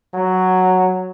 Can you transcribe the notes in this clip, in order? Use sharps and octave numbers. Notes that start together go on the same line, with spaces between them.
F#3